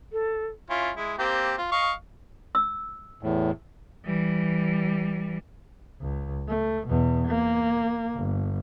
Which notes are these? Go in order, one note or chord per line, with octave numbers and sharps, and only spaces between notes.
A4
C#4 E4 F4
G#3 E4
A#3 C4 G4
F4
D#5 F5 C#6
E6
E2 A2
E3 G3
C#2
A3
E2 B2
A#3
G1